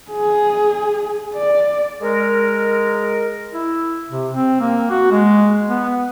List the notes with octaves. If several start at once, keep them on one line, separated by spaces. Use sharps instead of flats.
G#4
D5
G#3 A#4
E4
C3
C4
A#3
F#4
G#3
B3